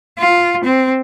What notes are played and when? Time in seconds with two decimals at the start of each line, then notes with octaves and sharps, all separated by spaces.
0.18 F4
0.64 C4